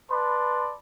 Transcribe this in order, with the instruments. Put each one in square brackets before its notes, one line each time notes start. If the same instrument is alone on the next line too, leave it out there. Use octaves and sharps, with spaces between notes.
[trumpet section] B4 D5 A5 B5 C6